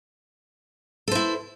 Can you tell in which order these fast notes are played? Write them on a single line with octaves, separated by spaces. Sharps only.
A4 C5 E4